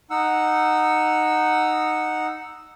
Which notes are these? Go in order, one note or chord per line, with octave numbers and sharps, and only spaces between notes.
D#4 F#5 E6